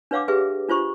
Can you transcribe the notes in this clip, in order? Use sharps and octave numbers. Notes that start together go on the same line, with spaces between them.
D4 B4 C#5 F5 F#5 D6
G4 G#4 B4 E5
D4 F4 C5 C#6